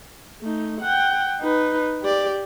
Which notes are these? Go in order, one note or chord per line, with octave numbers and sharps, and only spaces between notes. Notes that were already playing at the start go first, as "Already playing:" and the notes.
A3 D#4
F#5 G5
D#4 B4
G4 D5